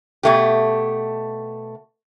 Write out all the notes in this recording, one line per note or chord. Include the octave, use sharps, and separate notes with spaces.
B2 A3 G4